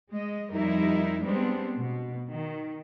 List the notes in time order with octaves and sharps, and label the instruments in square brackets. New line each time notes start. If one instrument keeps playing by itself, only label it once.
[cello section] G#3 D#5
F2 G3 D#4 E4 A#4
G3 G#3 B3 C4 D4
B2
D#3